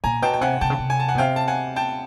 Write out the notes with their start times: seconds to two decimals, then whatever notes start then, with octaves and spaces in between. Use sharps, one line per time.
0.04 A#2 G#5 A#5
0.22 B2 G5 A5
0.34 G5
0.41 C3 F#5 G#5
0.61 C3 G5 A5
0.70 C#3
0.79 C3
0.90 G#5
1.00 A5
1.08 F#5 G#5
1.15 B2
1.18 C3 F5 G5
1.36 A5
1.48 F#5 G#5
1.76 G5 A5